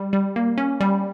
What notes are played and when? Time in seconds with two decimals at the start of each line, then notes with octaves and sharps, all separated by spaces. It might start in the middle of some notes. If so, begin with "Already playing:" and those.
Already playing: G3
0.13 G3
0.36 A#3
0.58 C#4
0.81 G3